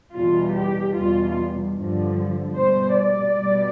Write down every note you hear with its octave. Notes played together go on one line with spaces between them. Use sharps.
E2 B2 G3 F4
G4
E2 B2 G3 F4
G2 D3 F3
B2 G3 C5
D5
B2 G3